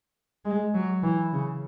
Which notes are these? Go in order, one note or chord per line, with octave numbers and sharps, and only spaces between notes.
G#3
F#3
E3
C#3